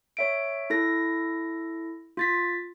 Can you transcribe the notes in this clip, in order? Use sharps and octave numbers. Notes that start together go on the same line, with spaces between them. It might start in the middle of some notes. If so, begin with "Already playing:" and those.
C#5 E5 D7
E4 A4 A#6
F4 A6 B6